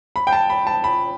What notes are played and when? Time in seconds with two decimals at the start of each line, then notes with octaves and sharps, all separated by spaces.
0.16 B5
0.27 G5
0.33 A5
0.50 B5
0.67 A5
0.84 B5